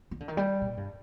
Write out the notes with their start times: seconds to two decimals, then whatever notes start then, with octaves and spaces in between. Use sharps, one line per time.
0.11 D#3
0.20 D3
0.28 D#3
0.37 G3
0.61 A#2
0.77 G2